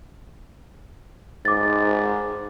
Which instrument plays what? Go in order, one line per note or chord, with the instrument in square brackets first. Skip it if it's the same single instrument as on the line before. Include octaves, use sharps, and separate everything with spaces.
[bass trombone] G#2 [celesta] D6 A6